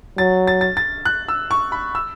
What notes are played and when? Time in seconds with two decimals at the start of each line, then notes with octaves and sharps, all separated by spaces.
0.18 F#3 A6
0.47 A6
0.61 A6
0.77 A6
1.06 F#6
1.29 E6
1.51 C#6
1.72 B5
1.95 E6